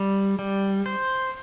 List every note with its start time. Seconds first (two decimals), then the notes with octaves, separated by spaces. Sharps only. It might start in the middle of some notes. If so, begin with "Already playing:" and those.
Already playing: G3
0.39 G3
0.86 C5